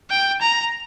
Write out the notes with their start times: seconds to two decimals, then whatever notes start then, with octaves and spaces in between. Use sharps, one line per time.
0.11 G5
0.41 A#5